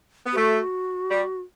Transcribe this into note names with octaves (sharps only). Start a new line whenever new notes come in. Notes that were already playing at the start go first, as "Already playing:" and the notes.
B3
G4
A3 F#4
G3